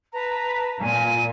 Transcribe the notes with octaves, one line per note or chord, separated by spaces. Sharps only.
B4 A5 A#5
A#2 G#5